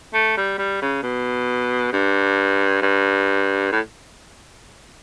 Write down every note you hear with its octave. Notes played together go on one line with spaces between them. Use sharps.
A3
G3
G3
C#3
B2
G2
G2
A2